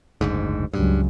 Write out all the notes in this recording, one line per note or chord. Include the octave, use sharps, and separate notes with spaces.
F#1 D2 G#2
C#2 G2 F#3